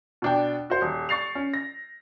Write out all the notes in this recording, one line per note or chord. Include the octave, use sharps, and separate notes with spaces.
B2 D4 G5
F#4 C5
D#1
C#6 A6 C7 F7
C#4
A#6